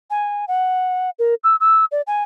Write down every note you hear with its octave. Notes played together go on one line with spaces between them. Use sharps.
G#5
F#5
A#4
E6
E6
D5
G#5